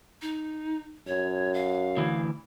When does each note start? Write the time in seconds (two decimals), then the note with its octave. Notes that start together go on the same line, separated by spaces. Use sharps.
0.22 D#4
1.07 F#2 C#5
1.54 F5
1.97 D2 E3